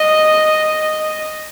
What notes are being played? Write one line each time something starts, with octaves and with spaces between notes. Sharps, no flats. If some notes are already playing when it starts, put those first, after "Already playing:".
Already playing: D#5